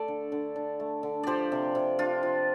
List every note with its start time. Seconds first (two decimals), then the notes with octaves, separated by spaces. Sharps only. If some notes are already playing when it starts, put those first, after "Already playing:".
Already playing: A3 A4 D5
0.08 D3
0.32 D3
0.56 D4
0.80 A3
1.03 D3
1.23 F3 G4 C5 D5
1.52 C3
1.75 C3
1.99 D4 F4
2.23 F3